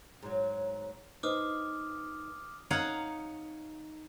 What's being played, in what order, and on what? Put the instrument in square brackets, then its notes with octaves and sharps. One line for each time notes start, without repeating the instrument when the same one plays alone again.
[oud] G#2 F#3
[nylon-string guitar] D#4 B4 C5 [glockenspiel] D6 D#6 F6
[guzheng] D#4 C#5 F5 F#5